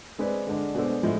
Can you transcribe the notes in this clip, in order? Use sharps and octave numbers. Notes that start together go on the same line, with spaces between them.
G#3 C4 G#4 B4 D5
D3 G#3 D4
B2 G#3 D4 A4 C5
A2 F3 G#3